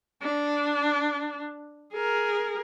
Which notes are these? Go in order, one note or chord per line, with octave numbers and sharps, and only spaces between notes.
D4
G#4 A#4